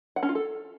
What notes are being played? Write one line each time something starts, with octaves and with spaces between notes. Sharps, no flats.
F#5
C#4
F4
A4